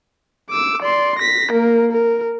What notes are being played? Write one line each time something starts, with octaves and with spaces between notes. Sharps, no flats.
D6 E6
D5 C6
A#6 B6
A#3 A#4
A#4